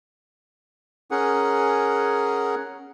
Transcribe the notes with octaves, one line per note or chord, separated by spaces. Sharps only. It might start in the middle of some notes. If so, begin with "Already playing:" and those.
C#4 G#4 A#4 F#5